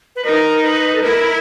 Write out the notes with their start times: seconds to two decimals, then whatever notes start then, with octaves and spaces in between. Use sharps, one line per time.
0.16 B4
0.25 D#4 A#4
0.63 B4
0.95 A4
1.02 E4 A#4